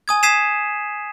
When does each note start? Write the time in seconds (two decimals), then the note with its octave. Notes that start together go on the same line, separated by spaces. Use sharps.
0.08 G#5 D#6 G#6
0.23 D#6 G#6 B6 C7 D#7 E7